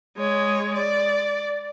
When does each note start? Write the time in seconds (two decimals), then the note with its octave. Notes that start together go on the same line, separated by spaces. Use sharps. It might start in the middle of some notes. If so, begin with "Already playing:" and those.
0.17 G#3 C#5
0.75 D5